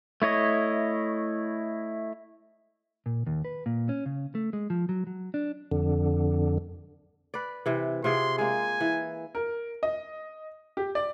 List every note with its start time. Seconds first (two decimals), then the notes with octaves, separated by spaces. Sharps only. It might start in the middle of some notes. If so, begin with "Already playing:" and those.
0.22 A3 E4 C#5 D#5
3.06 A#2
3.27 D#2
3.45 B4
3.66 A#2
3.89 C#4
4.06 C#3
4.35 A3
4.53 G#3
4.70 F3
4.89 F#3
5.07 F#3
5.34 D4
5.71 F2 D3
7.34 B4 D5
7.66 C3 E3
8.04 C3 F4 G#4 C6
8.38 G#3 A#3 G#5
8.81 E3
9.35 A#4
9.83 D#5
10.77 G4
10.95 D5